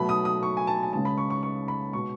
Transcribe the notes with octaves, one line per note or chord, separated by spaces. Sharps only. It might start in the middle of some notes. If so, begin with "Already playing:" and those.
Already playing: B2 F#3 A3 B5
D#6
D#6
C#6
G#5
A5
G#5
C#2 C#3 G#3 A5
B5
C#6
C#6
C#6
B5
B2 G#3 C#6